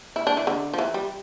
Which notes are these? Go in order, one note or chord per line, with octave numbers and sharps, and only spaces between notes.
E4
D4
E3
D3
F3
E3
G3